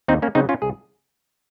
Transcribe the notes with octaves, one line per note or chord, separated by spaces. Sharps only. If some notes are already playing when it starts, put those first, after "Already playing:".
D#2 C4 D#4
A#3 C#4
C#3 F#3 C4 D#4
C#4 F4
C2 G#4